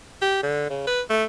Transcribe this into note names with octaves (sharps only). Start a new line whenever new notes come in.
G4
D3
C#3
B4
A3